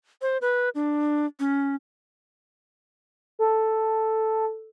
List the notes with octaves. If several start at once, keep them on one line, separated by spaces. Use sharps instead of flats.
C5
B4
D4
C#4
A4